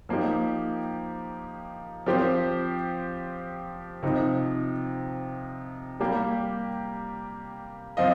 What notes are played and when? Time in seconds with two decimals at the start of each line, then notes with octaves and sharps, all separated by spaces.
0.09 F3 A#3 D#4 G4
2.06 F3 C4 G4 C5
4.03 C3 F3 D#4
5.99 G3 A#3 G4
7.97 F3 C4 F4 D#5